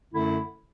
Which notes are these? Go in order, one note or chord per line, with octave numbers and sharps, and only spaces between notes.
F#2 D3 A3 E4